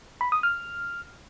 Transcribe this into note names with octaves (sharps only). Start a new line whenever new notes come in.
B5
D#6
F6